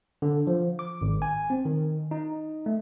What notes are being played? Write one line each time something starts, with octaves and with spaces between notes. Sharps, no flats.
D3
F3
D6
G#1
G#5
C4
D#3
D#4
A3